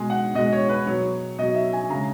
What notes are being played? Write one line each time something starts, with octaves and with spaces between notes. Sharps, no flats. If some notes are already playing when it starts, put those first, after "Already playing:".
Already playing: B2 G#3 G#5
F#5
B2 G#3 D#5
C#5
B4
B2 F#3 C#5
B2 F#3 D#5
E5
G#5
C#3 G#3 A#5